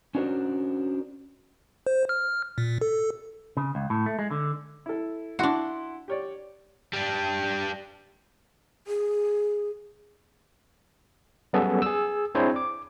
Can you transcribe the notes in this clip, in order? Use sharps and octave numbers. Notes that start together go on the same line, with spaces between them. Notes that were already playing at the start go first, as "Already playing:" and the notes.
C#4 D4 F#4 A#4 C5
C5
F6
A#2
A4
C#3
C#2
A2
A3
G#3
D3
E4 A4
D4 E4 F#4 F#5 C6
G4 C#5 D5
G3 D4
G#4
F#3 G3 B3 C#4 G#4 A4
G#4 E6
C4 D4 E4 G#4 C5 C#5
D6